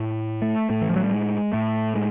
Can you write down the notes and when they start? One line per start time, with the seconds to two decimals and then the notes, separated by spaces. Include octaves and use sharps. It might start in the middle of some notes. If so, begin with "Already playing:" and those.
Already playing: A2
0.42 A3
0.70 A2 A3
0.82 E3
0.89 F3
0.96 F#3
1.04 G3
1.12 G#3
1.53 A2 A3
1.95 G#3